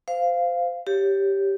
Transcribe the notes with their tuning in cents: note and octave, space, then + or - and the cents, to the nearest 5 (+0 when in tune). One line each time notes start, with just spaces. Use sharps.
C5 -20 F5 -5
G4 +0 C#5 +5